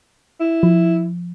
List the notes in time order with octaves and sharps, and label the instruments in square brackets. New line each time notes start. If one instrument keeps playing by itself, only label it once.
[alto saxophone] E4
[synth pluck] F3